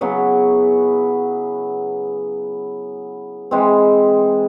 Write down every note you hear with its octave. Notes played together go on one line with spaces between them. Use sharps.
C#3 F#3 B3 E4
E3 G#3 C4